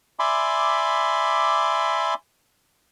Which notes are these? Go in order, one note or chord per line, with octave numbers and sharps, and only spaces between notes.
D5 E5 G#5 B5 C6 D6